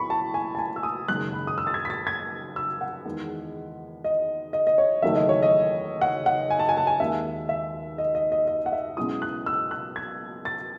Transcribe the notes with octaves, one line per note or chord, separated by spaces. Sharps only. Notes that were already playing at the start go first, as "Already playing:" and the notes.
Already playing: B1 A2 B5 C#6
A5
G#5
A5
G#5
E6
D#6
F#1 F#2 D#3 G#3 F#6
B5
D#6
E6
A6
G#6
B6
A6
G#6
E6
F#5
E2 D#3 G#3
D#5
D#5
D#5
C#5
F#1 E2 D#3 F#3 A3 E5
D#5
C#5
D#5
F#5
F#5
G#5
A5
G#5
A5
G#5
D#2 D#3 G#3 E5
E5
D#5
D#5
D#5
D#5
F#5
E5
B1 B2 G#3 C#4 E4 D#6
F#6
E6
F#6
G#6
A6